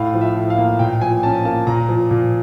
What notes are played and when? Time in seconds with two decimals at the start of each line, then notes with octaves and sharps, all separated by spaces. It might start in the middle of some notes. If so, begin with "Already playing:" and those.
Already playing: A2 F5
0.14 F3
0.21 E5
0.36 A2
0.50 F5
0.58 A#3
0.79 A#2 G5
1.01 F3 G#5
1.23 C#4 A5
1.45 A#3 A5
1.67 A#2 A#5
1.89 F3
2.11 A#2